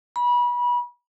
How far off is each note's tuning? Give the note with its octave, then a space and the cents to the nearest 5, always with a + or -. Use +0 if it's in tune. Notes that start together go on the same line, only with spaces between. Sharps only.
B5 -25